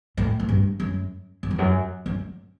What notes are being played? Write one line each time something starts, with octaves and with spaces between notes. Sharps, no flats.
A2
A2
G2
F#2
F#2
E2
F#2
F#2